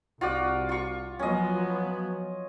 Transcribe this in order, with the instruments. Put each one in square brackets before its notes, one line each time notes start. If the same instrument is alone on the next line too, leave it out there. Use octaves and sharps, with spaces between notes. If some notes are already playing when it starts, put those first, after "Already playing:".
[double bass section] C2 [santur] F4 F#4 D5
[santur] F4 C#6
[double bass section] F3 F#3 B3 [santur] C#4 D#5